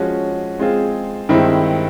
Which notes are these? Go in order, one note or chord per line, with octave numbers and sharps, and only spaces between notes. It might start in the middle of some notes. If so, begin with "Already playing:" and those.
Already playing: F3 G#3 C#4 F#4
G#3 C4 F4 G#4
G2 D#3 G#3 C4 E4